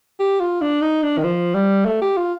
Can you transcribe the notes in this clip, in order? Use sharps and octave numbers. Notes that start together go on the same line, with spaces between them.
G4
F4
D4
D#4
D4
D#3
F3
G3
A3
G4
F4